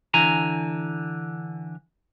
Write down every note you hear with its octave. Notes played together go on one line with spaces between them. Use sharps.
D3 E3 G#5 A#5